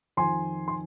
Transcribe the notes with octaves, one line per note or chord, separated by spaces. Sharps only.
F2 D#3 G#5 C6
C6